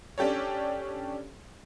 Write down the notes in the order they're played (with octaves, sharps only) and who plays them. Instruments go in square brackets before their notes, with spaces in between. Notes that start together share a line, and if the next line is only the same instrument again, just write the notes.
[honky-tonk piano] C#4 D4 G4 A4 C#5